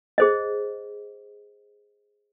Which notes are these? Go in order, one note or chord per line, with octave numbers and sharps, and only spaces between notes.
G#4 C5 D#5